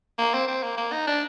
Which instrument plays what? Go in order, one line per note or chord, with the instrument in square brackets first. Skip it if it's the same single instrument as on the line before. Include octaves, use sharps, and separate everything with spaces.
[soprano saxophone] A#3
C4
C4
A#3
A#3
D#4
D4